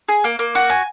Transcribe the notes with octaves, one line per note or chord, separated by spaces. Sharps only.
G#4
A#3
A#3
F#4
G#5